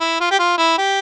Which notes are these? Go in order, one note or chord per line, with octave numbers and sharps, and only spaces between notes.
E4
F4
G4
F4
E4
G4